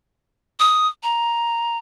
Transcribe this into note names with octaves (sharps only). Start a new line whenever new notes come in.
D#6
A#5